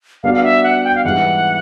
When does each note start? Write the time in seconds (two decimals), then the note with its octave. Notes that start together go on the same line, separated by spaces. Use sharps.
0.23 G3 B3 D4 F#4 F5
0.34 F5
0.43 E5
0.63 F#5
0.84 G5
0.95 F5
1.04 G#2 E3 G3 F#5